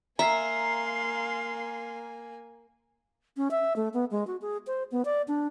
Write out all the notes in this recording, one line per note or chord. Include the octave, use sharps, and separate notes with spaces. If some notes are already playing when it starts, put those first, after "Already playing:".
A#3 E5 F5 G#5 A#5 C6
C#4
E5
A3
B3
G#3
F#4
G#4
C5
B3
D5
D4